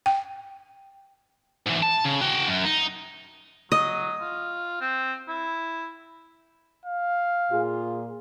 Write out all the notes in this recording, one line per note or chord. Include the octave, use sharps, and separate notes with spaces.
G5
G#2 E3
A5
C#3
F#4 G5
F#2
D#4
F#3 D#5
F4
C4
E4
F5
A#2 F4 G#4